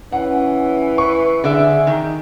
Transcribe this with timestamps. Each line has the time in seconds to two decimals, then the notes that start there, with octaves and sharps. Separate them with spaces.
0.12 E3 C#4 F#5
0.98 B4 C#6
1.44 D3 G#4 D5 E5
1.87 D#3